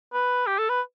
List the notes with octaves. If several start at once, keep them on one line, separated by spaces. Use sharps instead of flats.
B4
G4
A4
B4